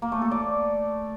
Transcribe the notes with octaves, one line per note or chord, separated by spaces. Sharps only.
A#3
A3
A4
D5